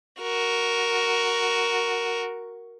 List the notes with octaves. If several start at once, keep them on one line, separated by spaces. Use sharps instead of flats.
F#4 A#4